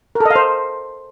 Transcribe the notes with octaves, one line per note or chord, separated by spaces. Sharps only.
A#4
A4
D#5
F5
C5